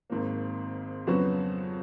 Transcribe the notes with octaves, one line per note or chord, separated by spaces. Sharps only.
G#1 G#2 D#3 A#3
F2 C#3 F#3 B3 F#4